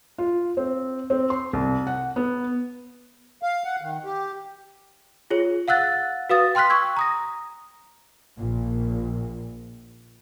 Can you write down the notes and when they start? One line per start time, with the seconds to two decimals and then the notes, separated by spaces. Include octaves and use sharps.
0.18 F4
0.57 C4
1.10 C4
1.30 C6
1.53 C2
1.87 F#5
2.16 B3
3.43 F5
3.65 F#5
3.82 D#3
4.05 G4
5.30 F4 G#4 C#5
5.68 F5 F#5 E6 F#6 A6
6.29 F#4 B4 F5 D#6 A6
6.55 G5 C6 F6 F#6 B6
6.70 C#6 E6 G#6
6.97 A#5 D#6 A#6
8.38 A#1 A#2